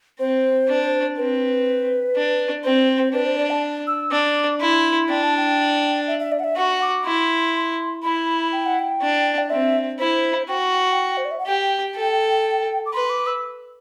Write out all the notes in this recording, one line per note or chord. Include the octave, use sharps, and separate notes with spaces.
C4 C5
D4
C4 B4
D4
C4 C5
D4 B4
C5
D5
A5
E6
D4 D6
E4 C6
D4 G5
A5
G5
E5
E5
D5
F#5
E5
F#4 F#5
D6
E4 C6
E4 B5
G5
F#5
G5
D4
D5
C4 E5
E4 C5
F#4 G5
C5
D5
E5
F#5
G4 G5
A4
D6
B4 C6
D6
E6